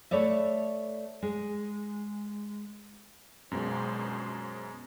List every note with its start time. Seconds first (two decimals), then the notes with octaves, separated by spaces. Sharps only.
0.11 A3 B4 C#5 D5 E5
1.23 G#3
3.51 A#1 F#2 B2 G#3 C5